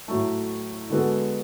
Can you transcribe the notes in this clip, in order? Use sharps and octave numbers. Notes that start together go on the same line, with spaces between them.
A2 F#3 A3
D3 G#3 B3 F#4 A4